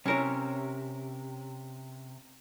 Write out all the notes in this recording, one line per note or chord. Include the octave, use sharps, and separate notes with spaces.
C3 C#4 A#4 C#5